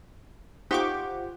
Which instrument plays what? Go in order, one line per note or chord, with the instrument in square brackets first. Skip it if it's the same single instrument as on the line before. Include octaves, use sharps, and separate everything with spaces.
[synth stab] D#4 C#6 D6 [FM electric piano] F4 C5 [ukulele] G4 [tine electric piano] F#5 G5